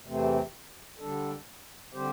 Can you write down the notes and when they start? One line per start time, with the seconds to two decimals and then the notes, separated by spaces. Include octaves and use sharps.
0.04 E2 C3 E3 A3 C4
0.98 D3 G3 D4 A4
1.92 D3 G3 C4 G4 C5